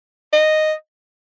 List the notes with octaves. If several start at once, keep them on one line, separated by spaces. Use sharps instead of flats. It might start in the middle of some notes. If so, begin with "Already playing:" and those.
D#5